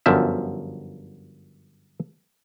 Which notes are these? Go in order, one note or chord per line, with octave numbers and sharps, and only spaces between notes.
G1 F#2 F3 E5